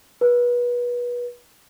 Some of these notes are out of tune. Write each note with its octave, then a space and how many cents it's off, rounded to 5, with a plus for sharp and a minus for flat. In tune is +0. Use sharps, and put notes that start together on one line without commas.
B4 -30